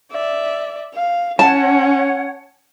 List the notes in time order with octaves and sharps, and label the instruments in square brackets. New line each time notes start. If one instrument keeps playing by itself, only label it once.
[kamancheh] D5 E5
F5
[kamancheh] C#4 [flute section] C#5 F#5 [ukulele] A5